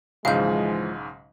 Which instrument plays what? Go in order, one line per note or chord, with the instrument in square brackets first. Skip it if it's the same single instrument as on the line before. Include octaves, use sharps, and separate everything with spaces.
[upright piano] B1 G#2 C#3 [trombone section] E3 F3 G#3 [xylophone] F5 G6